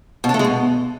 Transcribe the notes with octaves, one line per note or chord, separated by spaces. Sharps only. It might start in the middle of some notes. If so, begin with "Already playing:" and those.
B2
D4
A3
G#3
B2